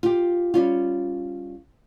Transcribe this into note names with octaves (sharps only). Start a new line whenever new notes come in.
F4 G4
G3 C#4 F4